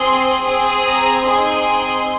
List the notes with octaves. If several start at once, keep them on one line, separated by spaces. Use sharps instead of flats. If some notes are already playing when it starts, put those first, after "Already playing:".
Already playing: C4 G#4 C6
C4 G#4
A#5
C4 D#4 G#4 C6